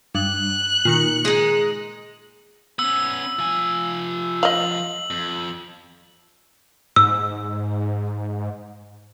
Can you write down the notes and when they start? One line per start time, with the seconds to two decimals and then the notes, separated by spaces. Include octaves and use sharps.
0.15 G2 F#6
0.85 A#2 D#3 C#7
1.25 G#3 D#4
2.79 B3 C#4 E6
3.39 F3 G#5
4.43 D#5 F5 F#7
5.11 F2
6.96 G#2 E6